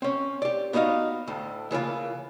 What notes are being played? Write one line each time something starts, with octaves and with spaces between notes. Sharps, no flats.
C4 C#4
G4 D5
B3 D#4 F#4 D#5 F5
D2 A2
C#3 E3 A#3 F4